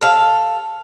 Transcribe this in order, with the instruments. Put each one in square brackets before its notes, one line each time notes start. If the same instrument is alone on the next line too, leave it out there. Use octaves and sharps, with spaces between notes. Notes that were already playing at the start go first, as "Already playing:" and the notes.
[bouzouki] A4 F5